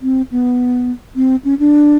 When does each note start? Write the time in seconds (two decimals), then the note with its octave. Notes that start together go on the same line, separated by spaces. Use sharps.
0.02 C4
0.31 B3
1.16 C4
1.45 C#4
1.59 D4